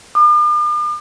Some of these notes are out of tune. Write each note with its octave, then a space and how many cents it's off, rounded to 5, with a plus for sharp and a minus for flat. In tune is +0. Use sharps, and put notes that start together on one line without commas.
D6 +45